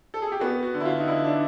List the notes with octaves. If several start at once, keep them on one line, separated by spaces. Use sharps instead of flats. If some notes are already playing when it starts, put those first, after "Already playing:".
A4
G#4
G4
B3 F#4
F#4
D3
E4
F4
D#4
D3 E4
D4